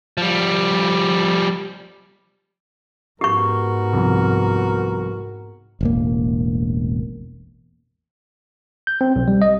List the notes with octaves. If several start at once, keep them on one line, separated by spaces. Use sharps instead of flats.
F3 G3
G#2 B3 F#4 G4 A#4 C#6
C2 F2
E1 A1 A#3
G6
C4
B1
G3
D#5